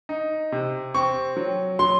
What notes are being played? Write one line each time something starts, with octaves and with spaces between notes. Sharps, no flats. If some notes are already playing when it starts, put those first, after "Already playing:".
D#4
C3
C4 C#6
F#3
F#3 C6